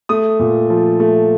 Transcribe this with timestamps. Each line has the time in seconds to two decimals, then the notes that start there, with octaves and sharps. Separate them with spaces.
0.09 A3 D#6
0.39 A#2
0.70 F3
1.00 A3